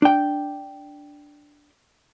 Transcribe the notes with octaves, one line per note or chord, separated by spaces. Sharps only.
D4 G5